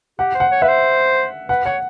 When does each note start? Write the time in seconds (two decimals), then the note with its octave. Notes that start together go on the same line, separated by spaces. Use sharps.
0.19 G4 F#5
0.34 C5
0.40 F#5
0.51 C#5
0.62 B4 E5
0.68 C5
1.49 B4 F#5
1.65 C#5 F#5